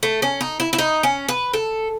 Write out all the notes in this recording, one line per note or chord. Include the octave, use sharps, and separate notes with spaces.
A3
C#4
D#4
E4
E4
D#4
C#4
B4
A4